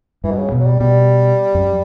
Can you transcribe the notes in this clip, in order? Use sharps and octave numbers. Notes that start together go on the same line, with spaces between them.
G2 E3
B2
C#3
B2
F#3
G3
B2 G3
F#2